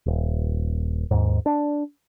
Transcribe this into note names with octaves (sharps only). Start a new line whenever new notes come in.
D#1
D#2 G#2
D4